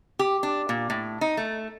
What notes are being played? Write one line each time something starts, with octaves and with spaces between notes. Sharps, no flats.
G4
D4
A#2
A2
D#4
A3